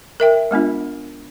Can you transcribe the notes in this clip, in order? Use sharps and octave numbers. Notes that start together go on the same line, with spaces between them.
A#4 E5 G5
G#3 B3 D4 F4